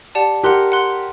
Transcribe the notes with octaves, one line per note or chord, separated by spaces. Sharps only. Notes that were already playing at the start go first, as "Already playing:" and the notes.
G4 D5 F#5 A5
G4 A#4 F#5 C6 F#6
F#5 C6 F#6